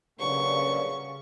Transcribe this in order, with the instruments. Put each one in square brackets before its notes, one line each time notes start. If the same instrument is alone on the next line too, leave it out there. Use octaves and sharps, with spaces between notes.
[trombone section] G2 A#2 F#3 [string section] C#3 [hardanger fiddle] C#6